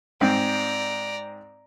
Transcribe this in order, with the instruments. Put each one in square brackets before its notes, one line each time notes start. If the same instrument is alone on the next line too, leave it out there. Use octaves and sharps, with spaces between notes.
[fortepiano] G#2 C4 [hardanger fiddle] D5 A#5